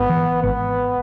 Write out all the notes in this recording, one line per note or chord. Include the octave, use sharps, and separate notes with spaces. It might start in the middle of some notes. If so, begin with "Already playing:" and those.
Already playing: G#1 B3
E3
G#1 B3